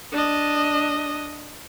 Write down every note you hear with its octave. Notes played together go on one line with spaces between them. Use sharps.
D4 D#5